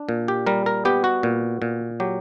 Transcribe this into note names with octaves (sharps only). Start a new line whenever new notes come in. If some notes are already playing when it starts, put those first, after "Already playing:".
Already playing: D4
A#2
G4
G3 A#4
A#4
B3 G4
F#4
A#2
A#2
F#3 G4